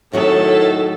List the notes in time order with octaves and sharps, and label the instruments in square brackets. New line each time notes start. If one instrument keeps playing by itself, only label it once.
[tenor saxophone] A2 [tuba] D#3 [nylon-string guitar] F#3 F#4 G#4 [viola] A3 A4